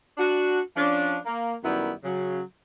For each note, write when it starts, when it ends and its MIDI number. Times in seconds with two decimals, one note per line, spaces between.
0.18 0.59 62
0.18 0.59 66
0.76 1.17 53
0.76 1.17 61
0.76 1.17 62
1.25 1.54 58
1.63 1.91 42
1.63 1.91 51
1.63 1.91 55
1.63 1.91 59
1.63 1.91 64
2.04 2.40 49
2.04 2.40 54